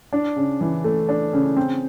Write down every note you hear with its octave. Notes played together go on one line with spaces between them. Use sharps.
D4
C#3
E3
A3
D4
C#3
C4